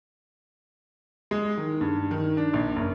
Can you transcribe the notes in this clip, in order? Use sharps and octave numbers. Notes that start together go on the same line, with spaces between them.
G#3
D#3
G2
D#3
D4
A#1
F#1